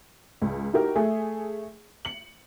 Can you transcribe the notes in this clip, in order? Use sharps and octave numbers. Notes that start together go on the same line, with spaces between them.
C#2
D#4 E4 F#4 G4 A#4
A3 G#4 E5
C#7 F#7